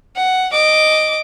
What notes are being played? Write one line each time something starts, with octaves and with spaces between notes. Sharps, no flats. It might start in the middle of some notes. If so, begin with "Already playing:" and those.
F#5
D#5 D6